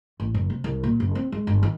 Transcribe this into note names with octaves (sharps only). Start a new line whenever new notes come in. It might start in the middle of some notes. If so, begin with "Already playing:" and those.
A1
F#1
C3
C2
A#2
F#1
C4
G#3
G1
D#3